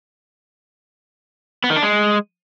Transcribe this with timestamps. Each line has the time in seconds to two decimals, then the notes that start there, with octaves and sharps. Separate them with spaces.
1.64 B3
1.70 D#3
1.76 D4
1.83 G#3